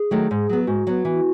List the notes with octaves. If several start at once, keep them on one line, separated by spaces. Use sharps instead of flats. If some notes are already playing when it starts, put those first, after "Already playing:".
Already playing: G#4
D#3 F#3 A3
G#2
F#3 B3
G#2 F#4
F#3 B3
E3